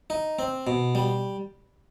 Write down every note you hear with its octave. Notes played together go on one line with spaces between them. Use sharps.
D#4
C4
B2
G3